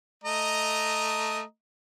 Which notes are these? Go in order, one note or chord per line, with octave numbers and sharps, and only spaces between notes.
A3 D#5 A#5